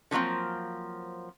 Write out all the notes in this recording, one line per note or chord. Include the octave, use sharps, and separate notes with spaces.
D3 F3 F#3 A#3 C4